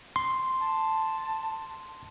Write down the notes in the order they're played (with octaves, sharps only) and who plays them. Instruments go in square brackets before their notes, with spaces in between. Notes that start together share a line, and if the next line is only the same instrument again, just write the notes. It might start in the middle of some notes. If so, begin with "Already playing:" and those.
[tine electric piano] C6
[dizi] A5